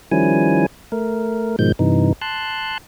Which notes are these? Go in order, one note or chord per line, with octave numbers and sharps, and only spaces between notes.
D#3 F3 G3 C#4 E4 G#5
A3 A#4
G#2 B2 D#3 F3 G#3 G6
G2 C3 E3 D#4
A5 C6 F#6